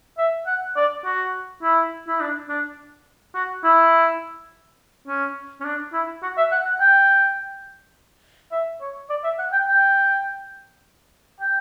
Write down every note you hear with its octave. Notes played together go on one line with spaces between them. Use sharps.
E5
F#5
D5
F#4
E4
E4
D4
D4
F#4
E4
C#4
C#4
D4
E4
F#4
E5
F#5
F#5
G5
E5
C#5
D5
E5
F#5
G5
G5
G5